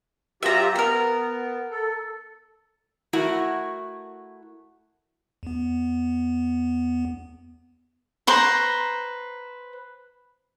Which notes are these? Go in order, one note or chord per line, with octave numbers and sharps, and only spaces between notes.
F#3 F4 G4 E5 A#5
B3 A#4 A#5
A4
A3 E4 F#4 A#4
E2 B3
B4 C5 A#5